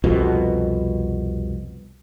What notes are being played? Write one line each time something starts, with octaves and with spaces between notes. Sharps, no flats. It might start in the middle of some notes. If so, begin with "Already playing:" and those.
C2 F2 B2